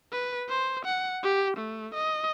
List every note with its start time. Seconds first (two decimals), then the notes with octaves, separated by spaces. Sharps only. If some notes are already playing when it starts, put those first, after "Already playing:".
0.12 B4
0.50 C5
0.86 F#5
1.23 G4
1.57 A3
1.94 D#5